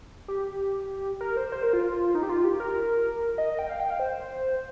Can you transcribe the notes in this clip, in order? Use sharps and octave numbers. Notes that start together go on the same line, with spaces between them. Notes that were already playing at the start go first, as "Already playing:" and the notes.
G4
A#4
C5
C5
A#4
F4
D#4
G4
F4
G4
A#4
D#5
G5
F5
G5
F5
C5